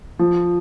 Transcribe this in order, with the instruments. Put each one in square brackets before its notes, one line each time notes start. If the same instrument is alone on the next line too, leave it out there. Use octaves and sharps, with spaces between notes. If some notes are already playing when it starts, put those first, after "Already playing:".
[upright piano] F3